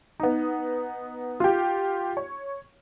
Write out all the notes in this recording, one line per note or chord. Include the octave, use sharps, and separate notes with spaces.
B3 D#4
F4 G4
C#5